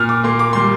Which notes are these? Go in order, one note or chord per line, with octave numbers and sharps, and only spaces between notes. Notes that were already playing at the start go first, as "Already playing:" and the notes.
Already playing: A#2 F6
D6
A#3 C6
D6
G3 C6